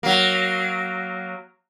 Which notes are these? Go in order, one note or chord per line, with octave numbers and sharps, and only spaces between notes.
F#3 A#3